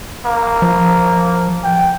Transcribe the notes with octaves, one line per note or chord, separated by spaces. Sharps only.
A#3
F3
G5